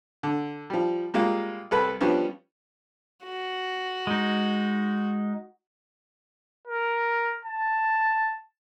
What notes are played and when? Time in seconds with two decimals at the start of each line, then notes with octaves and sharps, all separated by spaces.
0.23 D3
0.70 F3 G3
1.14 G3 G#3 A#3 F4
1.71 C2 A4 B4 B5
2.01 F3 G3 B3 C#4 D4
3.25 F#4
4.07 G#3 D#4
6.68 A#4
7.45 A5